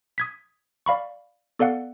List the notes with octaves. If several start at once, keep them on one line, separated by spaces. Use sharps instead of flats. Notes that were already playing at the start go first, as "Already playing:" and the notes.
D#6 G#6 B6
D5 F5 B5 C#6
B3 A4 D5 F5 F#5